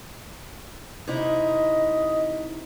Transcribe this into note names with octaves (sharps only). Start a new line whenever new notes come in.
C3 D#4 E4 D#5